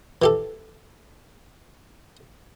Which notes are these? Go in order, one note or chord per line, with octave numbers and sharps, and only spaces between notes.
E3 G4 A4